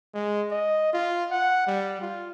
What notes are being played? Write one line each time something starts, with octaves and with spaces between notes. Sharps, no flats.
G#3
D#5
F4
F#5
G3
F4